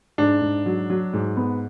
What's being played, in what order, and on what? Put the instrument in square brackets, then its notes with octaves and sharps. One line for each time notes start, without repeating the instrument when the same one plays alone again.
[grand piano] G#2 D4
G#2
F#3
F#3
G#2
B3